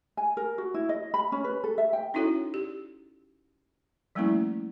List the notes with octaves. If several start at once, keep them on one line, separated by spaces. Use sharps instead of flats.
G#5
A#4
F#4
E4
D#5
B5
C#4
B4
A4
E5
G5
C#4 D#4 E4 F#4 A4 C#5
G4
F3 G3 A3 A#3 C#4 E4